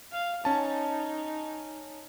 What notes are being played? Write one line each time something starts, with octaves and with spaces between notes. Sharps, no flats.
F5
C#4 D#4 A5